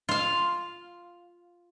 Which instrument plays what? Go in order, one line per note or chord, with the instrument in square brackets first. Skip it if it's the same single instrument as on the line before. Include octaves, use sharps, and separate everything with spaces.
[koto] F4 F5